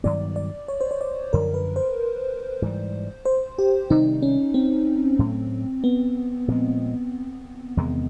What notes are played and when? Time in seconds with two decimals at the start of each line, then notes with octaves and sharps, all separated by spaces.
0.04 G2 D#3 F#3 B3 D5
0.36 D5
0.68 C#5
0.81 C5
0.91 C#5
1.01 D5
1.33 F#2 D3 F3 A#4
1.54 B4
1.76 C5
2.62 G#2 E3 G3
3.25 C5
3.58 G4
3.90 C3 D#3 G3 D#4
4.22 C#4
4.54 C4
5.19 A2 F#3 A3 C#4
5.84 B3
6.48 A#2 F3 G#3
7.77 E2 C3 D#3 G#3